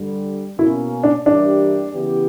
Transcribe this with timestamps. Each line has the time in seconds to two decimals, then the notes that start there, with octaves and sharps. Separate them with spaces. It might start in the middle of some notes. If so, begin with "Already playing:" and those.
Already playing: G2 D3 G3
0.58 B2 A#3 C#4 E4
1.03 D4
1.26 G2 E3 A#3 D4 E4 G4
1.92 C#3 E3 B3 E4 G4